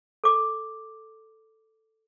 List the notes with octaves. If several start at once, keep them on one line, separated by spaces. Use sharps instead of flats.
A4 D6